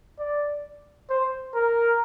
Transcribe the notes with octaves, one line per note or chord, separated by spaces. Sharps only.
D5
C5
A#4